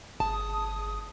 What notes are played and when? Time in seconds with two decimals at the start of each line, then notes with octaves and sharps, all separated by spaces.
0.20 G1 G#4 A5 D#6